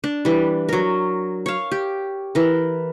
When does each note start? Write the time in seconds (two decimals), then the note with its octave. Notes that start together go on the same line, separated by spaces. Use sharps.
0.04 D4
0.25 E3 G3
0.69 F#3 A#4
1.46 C#5 F5
1.71 G4
2.35 E3 A#4